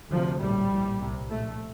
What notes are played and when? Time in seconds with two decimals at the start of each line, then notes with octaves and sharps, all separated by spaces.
0.10 D2 C3 F3
0.40 A#1 A2 G3
0.70 A#1 A2
1.00 C2 C3
1.29 A#1 A2 A3